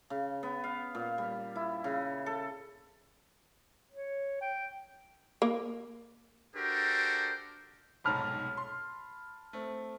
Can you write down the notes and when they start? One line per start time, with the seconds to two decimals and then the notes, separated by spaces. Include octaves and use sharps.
0.10 C#3
0.43 B3
0.64 F5
0.95 A#2
1.18 G3
1.56 E4
1.84 C#3
2.26 A4
3.92 C#5
4.41 G5
5.42 A#3
6.56 D4 F#4 G4 A4 A#4 C5
8.04 F1 B1 G#2 A5 B5 F6
8.57 C6
9.53 A3 C4